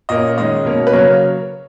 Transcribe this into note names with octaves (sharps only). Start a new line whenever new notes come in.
A#2 A#3 C#4 D#5
D#3 G#3 C#4 D#5
B2 A#3 C#4
B4
C#3 F#3 A#3 C#4 C#5